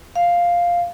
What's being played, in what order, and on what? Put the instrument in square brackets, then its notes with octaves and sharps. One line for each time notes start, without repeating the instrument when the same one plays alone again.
[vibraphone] F5